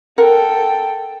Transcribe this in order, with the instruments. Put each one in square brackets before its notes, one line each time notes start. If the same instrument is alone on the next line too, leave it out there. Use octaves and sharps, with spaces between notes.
[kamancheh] A4 G5 [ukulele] A#4 F#5